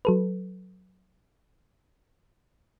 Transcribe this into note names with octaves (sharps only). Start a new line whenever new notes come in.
F#3 A4 B4